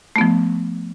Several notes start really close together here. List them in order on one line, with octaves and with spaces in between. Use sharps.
A3 B3 F3